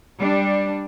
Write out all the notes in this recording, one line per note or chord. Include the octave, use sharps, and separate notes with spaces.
G3 D4